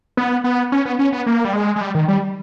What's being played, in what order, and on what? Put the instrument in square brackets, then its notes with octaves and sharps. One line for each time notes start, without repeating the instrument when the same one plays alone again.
[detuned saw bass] B3
B3
C#4
B3
C#4
B3
A#3
G3
G#3
G#3
G3
D#3
G3